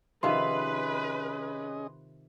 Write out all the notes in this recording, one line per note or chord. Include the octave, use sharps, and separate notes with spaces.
C3 D#3 F3 C#4 G#4 B4 D#5 C6